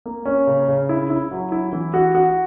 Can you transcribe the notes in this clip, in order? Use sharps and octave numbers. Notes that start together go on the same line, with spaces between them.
A#3
C#4
C#3
C#3
E4
E4
F#3
E4
E3
F#4
F#4